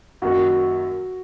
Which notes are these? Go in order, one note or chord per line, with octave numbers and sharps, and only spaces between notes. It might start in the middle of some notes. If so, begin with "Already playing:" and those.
F#2 D#3 F#3 A#3 F#4